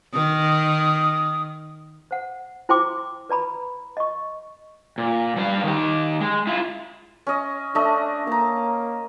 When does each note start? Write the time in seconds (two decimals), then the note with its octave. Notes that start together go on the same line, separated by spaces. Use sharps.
0.14 D#3 D#6
2.11 C5 F#5
2.69 E4 C5 G5 C6 D6
3.29 B4 D5 A#5 B5
3.97 D#5 C#6
4.98 A#2
5.36 G3 B4 F5
5.64 D#3 G4
6.21 G#3
6.47 E4 F4
7.27 C#4 D#5
7.75 A3 D4 D#5
8.27 A#3 A5 A#5